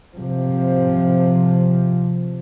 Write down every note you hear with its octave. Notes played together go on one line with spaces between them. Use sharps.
C3 F3